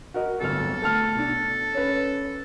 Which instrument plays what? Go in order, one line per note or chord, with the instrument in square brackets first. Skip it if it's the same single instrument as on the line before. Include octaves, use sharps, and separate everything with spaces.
[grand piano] F#4 A#4 D#5
[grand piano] D1 G1 F6 [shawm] A4
[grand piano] A3 A5 F6
B2 D4
C#4 B4